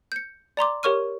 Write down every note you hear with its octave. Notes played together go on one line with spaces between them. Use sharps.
G6 C#7
D5 A#5 C6 D6
G4 A#4 C#5 C#6 F6 D#7